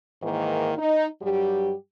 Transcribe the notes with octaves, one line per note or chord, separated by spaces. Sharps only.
G#2 D#3 E3 A#3 E4
D#4
G2 F#3 G3 G4